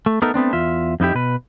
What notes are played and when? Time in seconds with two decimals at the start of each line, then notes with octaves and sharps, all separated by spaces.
0.06 A3
0.22 A3 B3 D#4 A4 A#4
0.34 A3 B3 C4 D4
0.53 E2 F4 E5
1.00 F2 D#4 E4 G4
1.15 B2 B4